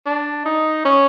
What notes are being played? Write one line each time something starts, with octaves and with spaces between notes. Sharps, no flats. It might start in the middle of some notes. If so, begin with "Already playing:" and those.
D4
D#4
C#4